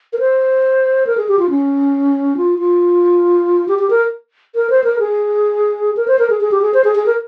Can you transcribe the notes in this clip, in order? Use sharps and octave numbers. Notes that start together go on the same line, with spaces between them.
A#4
C5
A#4
G#4
G4
F4
C#4
F4
F4
G4
G4
A#4
A#4
C5
A#4
G#4
A#4
C5
A#4
G#4
G#4
G4
G#4
C5
G#4
G#4
A#4